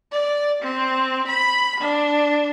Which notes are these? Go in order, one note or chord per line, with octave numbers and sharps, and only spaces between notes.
D5
C4
B5
D4